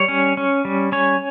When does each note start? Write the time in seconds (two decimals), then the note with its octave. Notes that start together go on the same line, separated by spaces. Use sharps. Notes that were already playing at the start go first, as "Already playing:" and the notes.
Already playing: G3 C#5
0.08 C#4
0.37 C#4
0.65 G3
0.92 C#4 C#5